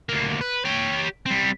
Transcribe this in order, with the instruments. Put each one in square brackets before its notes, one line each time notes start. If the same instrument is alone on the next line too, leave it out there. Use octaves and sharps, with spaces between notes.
[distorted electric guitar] D2 A#3
B4
G4 C#5
G3 C4